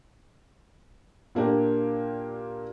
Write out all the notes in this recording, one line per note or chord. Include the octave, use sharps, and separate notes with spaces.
A#2 A#3 D4 G4